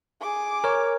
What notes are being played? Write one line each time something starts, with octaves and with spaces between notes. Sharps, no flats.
G#4 D6
A#4 C#5